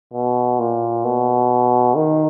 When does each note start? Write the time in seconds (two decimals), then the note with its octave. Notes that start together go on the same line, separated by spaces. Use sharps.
0.14 B2
0.59 A#2
1.05 B2
1.96 D#3